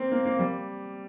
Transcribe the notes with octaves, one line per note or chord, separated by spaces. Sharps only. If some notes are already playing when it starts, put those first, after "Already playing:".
Already playing: A#3 C4
A#3
A#3
G3